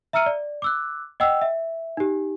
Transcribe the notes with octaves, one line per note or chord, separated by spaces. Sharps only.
E5 A#5 E6 F6 C#7 D#7
D5
D6 E6 F#6
D#5 F#5 G5 E6
E5
D#4 G4